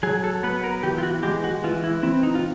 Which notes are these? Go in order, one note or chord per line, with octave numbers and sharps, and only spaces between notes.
F#3 G#4
A4
B3 B4
A#4
E3 G4
F4
F#4
G#3 G4
F#4
E3 F4
E4
C4 E4
D#4
F4